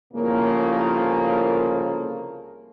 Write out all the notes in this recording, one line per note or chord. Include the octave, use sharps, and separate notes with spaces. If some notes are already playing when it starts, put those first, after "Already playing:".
C2 A2 C#3 F3 A#3